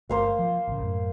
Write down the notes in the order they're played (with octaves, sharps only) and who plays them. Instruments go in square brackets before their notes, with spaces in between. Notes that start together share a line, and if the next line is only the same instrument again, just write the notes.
[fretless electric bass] G1 A3 [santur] A#3 C5 F5
[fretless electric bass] F3
A1 C#3
F#2 A2